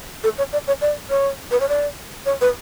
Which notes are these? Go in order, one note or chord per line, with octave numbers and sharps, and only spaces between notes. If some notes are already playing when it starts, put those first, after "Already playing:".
A4
C#5
D5
C#5
D5
C#5
B4
C#5
D5
C#5
B4